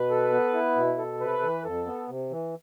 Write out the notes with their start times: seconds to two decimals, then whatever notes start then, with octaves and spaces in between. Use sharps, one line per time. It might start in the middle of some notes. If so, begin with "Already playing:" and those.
Already playing: B2 B4
0.10 A4
0.32 B3
0.54 E4
0.76 B2
0.98 A4
1.20 C3 B4
1.43 E3
1.64 F2 A4
1.86 B3
2.08 C3
2.31 E3